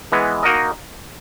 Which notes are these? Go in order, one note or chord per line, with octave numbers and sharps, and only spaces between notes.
E3 G#3 B3
A#3 D#4 F#4 A#4 D#5